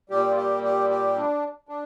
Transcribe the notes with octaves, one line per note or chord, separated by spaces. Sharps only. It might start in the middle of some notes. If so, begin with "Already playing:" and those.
A#2 G3 G4
F4
G4
G4
G4
D4
D4